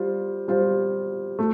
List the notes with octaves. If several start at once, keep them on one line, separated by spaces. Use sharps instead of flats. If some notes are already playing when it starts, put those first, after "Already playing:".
Already playing: G3 F4 C5
G3 F4 C5
A3